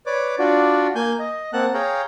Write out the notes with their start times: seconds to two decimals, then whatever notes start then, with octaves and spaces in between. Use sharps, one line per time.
0.06 B4 C#5 D5 D6
0.39 D4 F4 F#4 D5
0.95 A#3 G#5 G6
1.19 D#5
1.53 A#3 C4 F#5 A5 F#6
1.74 G#4 C#5 F5 G5 A#5